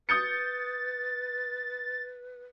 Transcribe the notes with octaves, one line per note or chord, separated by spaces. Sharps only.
B4 D#6 G6 A6 C#7